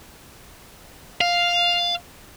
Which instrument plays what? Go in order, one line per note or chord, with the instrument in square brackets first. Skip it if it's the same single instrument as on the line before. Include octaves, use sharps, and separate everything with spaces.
[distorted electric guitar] F5